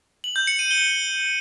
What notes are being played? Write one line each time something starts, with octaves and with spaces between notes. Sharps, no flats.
F#7
G6
C#7
D#7
G7